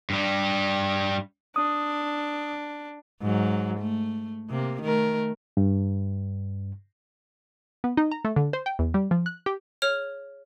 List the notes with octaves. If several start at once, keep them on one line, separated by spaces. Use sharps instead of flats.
G2 G3
D4 D#6
G#2 F#3
A3
C3 A#3
D#3 A3 A#4
G2
B3
D#4
A#5
A3
D3
C5
G5
E2
G3
F3
F#6
G4
G#4 C#5 F6 F7